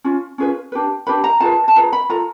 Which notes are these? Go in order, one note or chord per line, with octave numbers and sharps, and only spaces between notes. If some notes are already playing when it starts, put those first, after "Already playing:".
C#4 F4
C#4 F4 G#4 B4
D4 G4 B4
D4 G4 B4 B5
A#5
F4 G#4 B4 A5
A5
F4 G#4 B4 A#5
B5
F4 A4 A#5